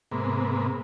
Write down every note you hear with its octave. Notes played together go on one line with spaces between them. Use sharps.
G#2 C3 A#3 B3